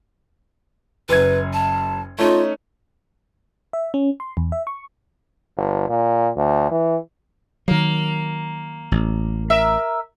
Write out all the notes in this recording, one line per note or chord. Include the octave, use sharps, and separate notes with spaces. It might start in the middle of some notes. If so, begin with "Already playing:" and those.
F#1 F#2 B4 G#6
A5
A3 C#4 D#4 F4
E5
C#4
C6
E2
E5
C#6
G1
A#2
D2
E3
D#3 F#3 A#3
A1
A#4 E5